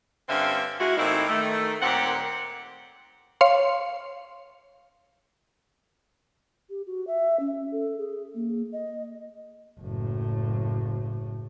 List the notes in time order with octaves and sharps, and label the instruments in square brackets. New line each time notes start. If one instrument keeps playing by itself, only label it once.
[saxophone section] G2 D3 C4 C#4 E5 F5
G#3 E4 F#4
A2 E3 A#3 C4 D#4 E4
D#3 A3
D#2 A#2 C4 G4 F#5
[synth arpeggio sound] C#5 F5 C6
[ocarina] G4
F#4
E5
C#4
A4
G#4
A#3
D#5
[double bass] F#1 A2